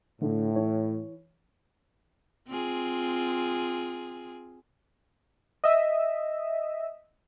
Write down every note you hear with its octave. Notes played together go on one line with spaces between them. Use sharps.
A2 D3 A3
E3 C#5
C4 F4 G#4
D#5 E5